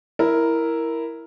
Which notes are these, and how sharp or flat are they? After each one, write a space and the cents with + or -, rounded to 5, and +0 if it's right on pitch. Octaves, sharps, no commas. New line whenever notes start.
E4 +0 A#4 +0